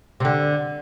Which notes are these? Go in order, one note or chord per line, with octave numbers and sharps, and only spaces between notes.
C3
D3